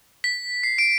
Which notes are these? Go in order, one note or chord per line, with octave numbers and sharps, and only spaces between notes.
B6
C7
D7